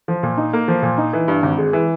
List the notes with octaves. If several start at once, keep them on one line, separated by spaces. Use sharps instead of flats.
F3
A#2
D#4
A#3
F3
A#2
D#4
E3
G2
G#1
G#3
E3